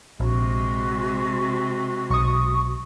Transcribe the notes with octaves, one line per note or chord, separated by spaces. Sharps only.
A#1 C3 G#3 F#4
B1 C#6 D#6